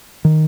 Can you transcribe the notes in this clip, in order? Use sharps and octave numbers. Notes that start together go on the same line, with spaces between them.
D#3